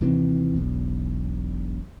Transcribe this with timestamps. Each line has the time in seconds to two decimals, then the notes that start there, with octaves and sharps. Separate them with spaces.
0.01 D#2 C3 E3 C4
0.56 E1 B1